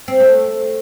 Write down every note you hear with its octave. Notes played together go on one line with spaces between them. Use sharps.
C4
A3